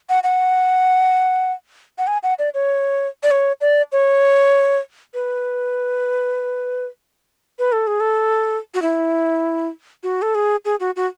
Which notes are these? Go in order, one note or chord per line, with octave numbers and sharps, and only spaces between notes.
F#5
F#5
F#5
G#5
F#5
D5
C#5
D5
C#5
D5
C#5
B4
B4
A4
G#4
A4
F#4
E4
F#4
A4
G#4
G#4
F#4
F#4